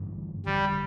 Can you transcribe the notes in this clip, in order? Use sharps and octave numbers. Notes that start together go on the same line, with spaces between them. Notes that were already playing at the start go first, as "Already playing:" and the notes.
Already playing: A1 G2 D3 A3
G1 F2 D3 G3